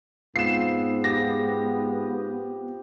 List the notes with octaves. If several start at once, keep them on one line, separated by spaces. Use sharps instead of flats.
G#2 F3 B3 C4 F4 C7 E7
G4 A#6